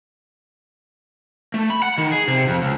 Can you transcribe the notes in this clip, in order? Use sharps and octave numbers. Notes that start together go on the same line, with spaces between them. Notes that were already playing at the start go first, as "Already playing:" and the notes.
A3
B5
F#5
D#3
G#4
C3
F2
C#2